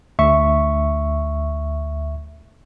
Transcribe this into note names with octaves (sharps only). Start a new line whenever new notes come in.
D2 E5 C#6